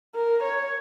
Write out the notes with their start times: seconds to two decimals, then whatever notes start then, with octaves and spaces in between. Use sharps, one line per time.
0.15 A#4
0.43 C#5